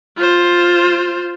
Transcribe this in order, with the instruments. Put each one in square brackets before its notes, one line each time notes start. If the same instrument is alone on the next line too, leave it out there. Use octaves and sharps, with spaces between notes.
[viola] F4 C5